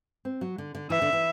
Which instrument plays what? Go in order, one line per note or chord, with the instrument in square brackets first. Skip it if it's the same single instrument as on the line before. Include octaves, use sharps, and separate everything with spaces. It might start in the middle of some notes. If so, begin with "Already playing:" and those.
[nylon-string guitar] C4
F#3
D3
D3
[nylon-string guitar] E3 [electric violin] E5
[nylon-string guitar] D3
E3